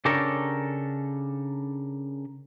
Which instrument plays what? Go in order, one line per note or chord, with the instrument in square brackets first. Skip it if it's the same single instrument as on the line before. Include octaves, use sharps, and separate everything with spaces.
[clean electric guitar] C#3 D4 G4 A4 A#4 C#5